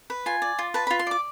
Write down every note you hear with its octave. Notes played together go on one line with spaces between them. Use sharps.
B4
F4 G#5
D5
F4
B4 A5
B5
F4
C6
D5 D6